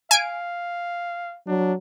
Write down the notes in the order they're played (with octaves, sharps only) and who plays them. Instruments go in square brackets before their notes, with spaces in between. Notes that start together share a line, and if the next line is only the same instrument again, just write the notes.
[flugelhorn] F5 [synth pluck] G#5 D7
[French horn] F#3 [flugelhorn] D4